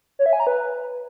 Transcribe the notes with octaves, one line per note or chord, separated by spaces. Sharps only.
C#5
E5
G#5
A#5
B4